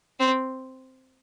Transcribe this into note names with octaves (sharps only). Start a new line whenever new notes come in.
C4